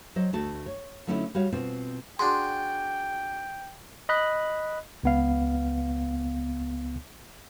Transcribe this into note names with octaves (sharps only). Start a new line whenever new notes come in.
F#3 C5 D#5
D2 A3 F#4 A5
C#5
D3 F#3 A3 C#4 D#4 E4
G3 F#4 C#5 F5
B2 C4 F4 C5
D4 F#4 G#4 G5 C6
D#5 B5 F#6
C#2 B3 F5